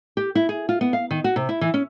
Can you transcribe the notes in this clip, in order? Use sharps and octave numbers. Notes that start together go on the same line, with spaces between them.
G4
E4
G#4
F4
B3
F5
D#3
F#4
C3
E4
E3
C#4